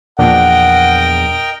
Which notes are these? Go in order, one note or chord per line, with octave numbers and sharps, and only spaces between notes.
E2 A#2 F3 D4 A#4 D#5 F#5 G5